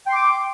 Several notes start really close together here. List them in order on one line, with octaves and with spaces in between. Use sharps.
G5 C6 D6